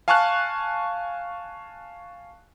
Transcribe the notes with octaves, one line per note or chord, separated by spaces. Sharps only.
F5 G#5 A5 C#6 F6 F#6